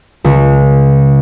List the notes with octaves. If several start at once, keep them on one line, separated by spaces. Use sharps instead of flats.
C#2